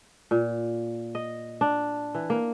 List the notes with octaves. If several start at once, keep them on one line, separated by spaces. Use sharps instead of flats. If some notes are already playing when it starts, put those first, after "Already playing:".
A#2
D#5
D4
E3
A#3